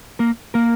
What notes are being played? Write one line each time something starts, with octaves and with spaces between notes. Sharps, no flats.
A#3 A#4
A#3 A#4